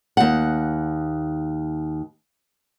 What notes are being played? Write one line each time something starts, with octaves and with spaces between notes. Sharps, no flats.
D#2 F#5